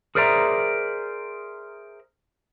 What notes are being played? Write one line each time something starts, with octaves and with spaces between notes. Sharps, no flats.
G#4 A#4 C5 D5 E5 A#5